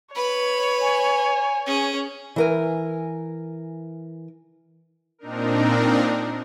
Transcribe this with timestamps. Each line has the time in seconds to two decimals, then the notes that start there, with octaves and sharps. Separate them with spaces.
0.15 B4 C#5 B5
0.82 G#5
1.67 C#4 G#4
2.36 E3 A#4 G#5
5.19 A#2 C4 D4 D#4 A#4